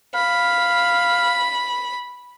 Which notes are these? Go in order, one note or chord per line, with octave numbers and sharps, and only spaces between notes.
F5 B5